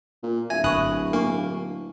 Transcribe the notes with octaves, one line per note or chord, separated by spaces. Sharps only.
A#2
D1 E5 G#5
G1 B5 C#6 D#6 F#6
A#3 D4 C#6